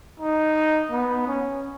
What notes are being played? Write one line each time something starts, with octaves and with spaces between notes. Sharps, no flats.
D#4
B3
C#4